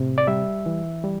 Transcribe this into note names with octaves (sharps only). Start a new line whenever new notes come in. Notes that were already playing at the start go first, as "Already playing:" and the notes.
Already playing: A2 C3
D5
G3 E5
E3
G3